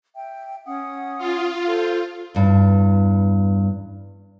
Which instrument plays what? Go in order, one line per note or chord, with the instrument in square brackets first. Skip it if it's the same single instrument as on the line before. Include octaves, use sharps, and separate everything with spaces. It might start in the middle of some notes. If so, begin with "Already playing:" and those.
[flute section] E5 G5
C#4 F#5 D#6
[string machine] F4
[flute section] A4 C5
[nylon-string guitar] E2 G2